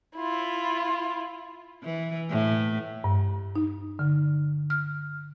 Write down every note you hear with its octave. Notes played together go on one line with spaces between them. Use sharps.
E4 F4
E3
A2
G2
D#4
D3
F6